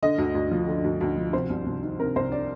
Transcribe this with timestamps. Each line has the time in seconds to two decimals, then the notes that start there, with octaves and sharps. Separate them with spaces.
0.02 D3 D#5
0.18 D2
0.35 D2
0.51 F3
0.68 D3
0.84 D2
1.01 D2
1.17 F3
1.33 C3 C5
1.50 C2
1.66 C2
1.83 D#3
2.00 C3 A#4
2.16 C2 C5
2.32 D5